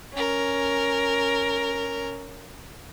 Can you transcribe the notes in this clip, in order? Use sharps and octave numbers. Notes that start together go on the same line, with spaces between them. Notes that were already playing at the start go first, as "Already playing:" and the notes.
C#4 A#4